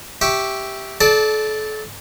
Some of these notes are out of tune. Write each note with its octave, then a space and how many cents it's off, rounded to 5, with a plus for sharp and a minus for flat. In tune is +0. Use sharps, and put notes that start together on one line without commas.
G4 -5 E5 -5 C#6 +0
A4 -35 D5 +0 A5 -15